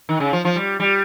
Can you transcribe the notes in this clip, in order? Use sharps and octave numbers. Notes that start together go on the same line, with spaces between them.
D#3
C#3
F3
F3
G3
G3